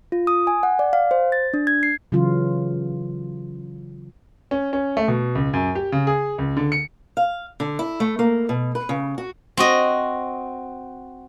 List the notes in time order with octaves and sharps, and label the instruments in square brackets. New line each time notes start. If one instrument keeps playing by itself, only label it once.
[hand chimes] F4
D#6
G#5
F#5
D5
F5
C5
A6
D4
G#6
C7
[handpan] C#3 E3 F#3 F4
[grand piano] C#4
C#4
A3
B2
C#2
F#2
G4
C#3
G#4
C#2
D3
C#7
[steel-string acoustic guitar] F5
D3
E4
A3
A#3
B2
B4
C#3
F#4
[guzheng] C4 F#4 D#5